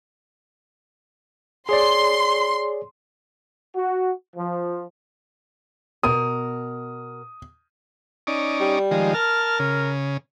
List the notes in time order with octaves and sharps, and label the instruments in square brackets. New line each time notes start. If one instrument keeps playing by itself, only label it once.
[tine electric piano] G#4 C#5 D5 [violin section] C6
[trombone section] F#4
F3
[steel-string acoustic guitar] B2 A#4 [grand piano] D#6
[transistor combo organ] C#4 D#4 D5
[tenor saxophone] G3
[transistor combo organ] D#3 F3 G#3
[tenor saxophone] A#4 [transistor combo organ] A5 F6
[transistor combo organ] C#3